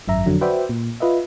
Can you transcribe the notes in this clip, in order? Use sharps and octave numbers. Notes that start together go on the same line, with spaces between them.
G#1 F#2 E5 A#5
F2 D3 F#3
F#4 B4 C5 D5 E5 G5
A#2
F4 B4 D#5 E5